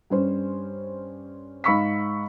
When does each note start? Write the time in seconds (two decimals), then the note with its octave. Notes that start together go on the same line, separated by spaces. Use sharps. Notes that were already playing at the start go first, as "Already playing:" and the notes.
0.10 G2 C#4 C5
1.64 G#2 F5 B5 C#6 E6 B6